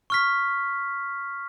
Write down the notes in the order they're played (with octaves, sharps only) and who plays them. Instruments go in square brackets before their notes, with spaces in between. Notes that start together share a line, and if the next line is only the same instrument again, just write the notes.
[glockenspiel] C#6 F6 B6